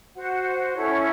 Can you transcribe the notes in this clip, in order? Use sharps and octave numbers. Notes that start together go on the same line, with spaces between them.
F#4 C5 F#5
C#4 E4 A4 C#5